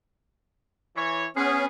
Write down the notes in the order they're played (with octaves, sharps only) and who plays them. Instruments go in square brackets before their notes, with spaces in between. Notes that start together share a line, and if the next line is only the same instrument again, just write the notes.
[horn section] E3 C#5
[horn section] B3 G#4 [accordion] C#4